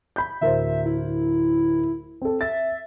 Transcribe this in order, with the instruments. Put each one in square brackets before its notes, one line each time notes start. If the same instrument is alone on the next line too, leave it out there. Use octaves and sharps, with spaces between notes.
[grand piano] B5 G6
[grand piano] D1 A#4 C5 [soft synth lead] E5
[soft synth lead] E4
[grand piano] C4 A4
[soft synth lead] E5 [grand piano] A6